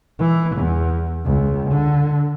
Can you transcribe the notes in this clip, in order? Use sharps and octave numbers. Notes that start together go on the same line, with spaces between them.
E3
E2
C#2
D3